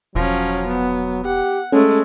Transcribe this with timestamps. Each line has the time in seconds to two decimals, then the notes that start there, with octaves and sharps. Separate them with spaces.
0.15 E1 F3 F#3 C#4
0.68 B3
1.25 G4 F#5
1.72 G#3 A3 C#4 A4